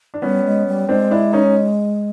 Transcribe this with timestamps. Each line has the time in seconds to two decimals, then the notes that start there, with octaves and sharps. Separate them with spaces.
0.14 D4
0.22 G3 B3 C#4
0.45 G#3
0.67 G3
0.89 G#3 C4 D4
1.11 D4 E4
1.33 C#4 D#4